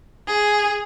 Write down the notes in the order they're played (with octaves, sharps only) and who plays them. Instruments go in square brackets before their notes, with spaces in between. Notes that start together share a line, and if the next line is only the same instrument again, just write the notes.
[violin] G#4